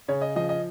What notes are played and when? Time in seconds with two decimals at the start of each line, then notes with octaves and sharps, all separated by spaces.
0.08 C#3 C#5
0.21 D#5
0.36 F3 D#5
0.49 D#5